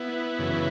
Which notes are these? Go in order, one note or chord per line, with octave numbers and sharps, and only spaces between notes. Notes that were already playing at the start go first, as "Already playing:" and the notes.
Already playing: B3 E4
F#2 C#3 E3